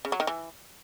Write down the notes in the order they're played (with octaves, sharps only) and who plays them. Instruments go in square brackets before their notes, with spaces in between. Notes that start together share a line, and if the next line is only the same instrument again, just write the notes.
[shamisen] C#3
F#3
D#3
E3